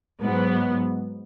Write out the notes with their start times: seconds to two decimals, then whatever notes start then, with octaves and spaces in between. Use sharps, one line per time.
0.22 G#2 F#3 B3